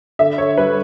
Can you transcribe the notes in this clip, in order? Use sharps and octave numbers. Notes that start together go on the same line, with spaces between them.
D3 E5
D3 C#5
G3 B4